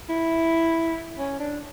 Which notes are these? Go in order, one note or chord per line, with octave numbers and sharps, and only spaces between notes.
E4
C#4
D4